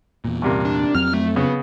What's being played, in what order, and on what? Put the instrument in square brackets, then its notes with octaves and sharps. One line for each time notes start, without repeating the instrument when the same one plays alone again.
[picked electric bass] E2 A#2
[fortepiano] G2 C3 A#3
[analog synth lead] D4
[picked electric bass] F2 F#3 C4 [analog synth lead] F6
[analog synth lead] A3
[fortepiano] C#3 [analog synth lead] B3